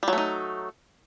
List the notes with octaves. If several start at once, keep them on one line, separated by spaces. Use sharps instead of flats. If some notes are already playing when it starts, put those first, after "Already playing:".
F#3 G3 A3 D#4